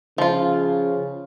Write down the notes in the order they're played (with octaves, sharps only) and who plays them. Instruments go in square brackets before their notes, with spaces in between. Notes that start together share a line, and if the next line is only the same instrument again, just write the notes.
[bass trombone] C#3 [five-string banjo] F3 F4